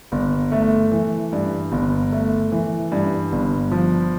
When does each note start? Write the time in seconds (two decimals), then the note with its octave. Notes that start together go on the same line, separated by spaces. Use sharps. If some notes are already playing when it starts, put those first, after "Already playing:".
0.12 G1
0.52 A3
0.92 E3
1.32 G2
1.72 G1
2.12 A3
2.52 E3
2.92 G2
3.32 G1
3.71 F3